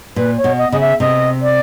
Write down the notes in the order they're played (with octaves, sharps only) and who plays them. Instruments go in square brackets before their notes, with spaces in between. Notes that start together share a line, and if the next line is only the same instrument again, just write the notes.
[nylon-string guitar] A#2 [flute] B4
[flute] C#5
[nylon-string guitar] B2
[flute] D#5
[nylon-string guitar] C#3 [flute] D#5
[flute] E5
[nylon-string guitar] C3 [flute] D#5
[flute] D5